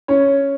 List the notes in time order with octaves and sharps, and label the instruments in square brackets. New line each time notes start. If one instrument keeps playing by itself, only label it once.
[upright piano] C#4 C#5